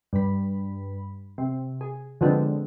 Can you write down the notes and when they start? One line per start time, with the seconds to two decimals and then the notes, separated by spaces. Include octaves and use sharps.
0.13 G2 B5
1.38 C3
1.81 G#4
2.21 D3 F3 G#3 B3 C4 D4